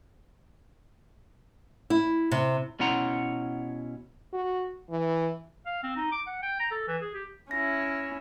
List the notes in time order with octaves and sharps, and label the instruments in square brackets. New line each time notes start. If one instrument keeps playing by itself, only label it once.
[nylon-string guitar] E4
C3
[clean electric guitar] B2 C#4 E4 F#5 A#5 C6
[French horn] F#4
E3
[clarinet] F5
C4
D#4
D6
F#5
G5
A#5
A4
E3
G#4
G4
[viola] C#4 E4 [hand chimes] A#6